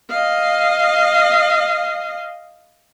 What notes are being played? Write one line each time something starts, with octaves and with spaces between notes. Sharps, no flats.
D#5 F5